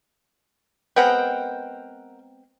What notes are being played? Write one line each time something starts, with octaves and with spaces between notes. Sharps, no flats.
G#3 B3 C4 A#4 F#5 G5